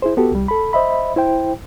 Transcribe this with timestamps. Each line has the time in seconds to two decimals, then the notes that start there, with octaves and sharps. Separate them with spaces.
0.02 E4 G#4 C5
0.17 B3 F#4 G4 A4
0.32 C2 G3
0.48 A4 B5
0.73 C5 D#5 E5 B5
1.16 E4 C5 G5